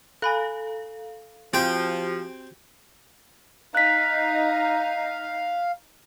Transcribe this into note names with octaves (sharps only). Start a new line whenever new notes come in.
A4 F5 G#5 B5 F#6
F3 C4 F#4 G4 G5
D#4 F5 F#6 B6